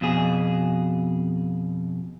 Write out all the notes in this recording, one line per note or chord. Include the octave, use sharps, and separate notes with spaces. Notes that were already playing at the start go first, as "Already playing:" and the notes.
F2 B2 G#4